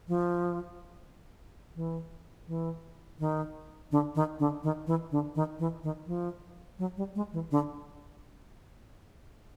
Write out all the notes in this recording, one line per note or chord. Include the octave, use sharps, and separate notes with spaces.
F3
E3
E3
D#3
D3
D#3
D3
D#3
E3
D3
D#3
E3
D#3
F3
F#3
G3
G#3
E3
D3